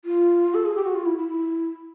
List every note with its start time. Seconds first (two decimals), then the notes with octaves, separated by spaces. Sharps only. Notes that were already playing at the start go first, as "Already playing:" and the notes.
0.05 F4
0.54 A4
0.65 G#4
0.75 G4
0.84 F#4
0.94 F4
1.06 E4
1.17 E4
1.28 E4